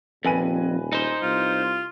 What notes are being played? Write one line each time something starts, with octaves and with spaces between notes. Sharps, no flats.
D#1 F2 B4 G#5 D#7
D#4 C5
C2 F4